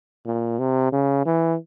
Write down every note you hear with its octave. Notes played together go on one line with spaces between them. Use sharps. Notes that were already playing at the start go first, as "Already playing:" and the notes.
A#2
C3
C#3
E3